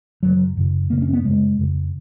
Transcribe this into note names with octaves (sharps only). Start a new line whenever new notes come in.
F#2 C#3 F#3
F#2 C#3
F#2 C#3 A#3
C#4
B3
F#2 C#3 G#3
F2 C#3